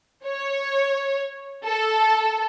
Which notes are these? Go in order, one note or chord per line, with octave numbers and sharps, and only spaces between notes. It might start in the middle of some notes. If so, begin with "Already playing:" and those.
C#5
A4